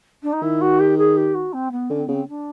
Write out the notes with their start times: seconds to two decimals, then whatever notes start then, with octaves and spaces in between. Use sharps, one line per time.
0.22 D4
0.32 D#4
0.42 D#3 E4
0.61 F#4
0.79 G4
0.97 G#4
1.16 G4
1.34 F#4
1.53 C4
1.71 B3
1.90 D3 C#4
1.99 C4
2.06 C#3 B3
2.14 C4
2.28 D4